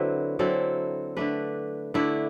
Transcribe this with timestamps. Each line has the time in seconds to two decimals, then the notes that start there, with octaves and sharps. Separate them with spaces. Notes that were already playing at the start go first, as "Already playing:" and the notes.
Already playing: D3 F#3 C4 E4 B4
0.39 D3 F#3 C4 E4 A4
1.17 D3 A3 D4 B4
1.94 D3 A3 D4 E4